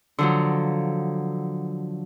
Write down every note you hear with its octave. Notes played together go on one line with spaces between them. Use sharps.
D3 F3 F#3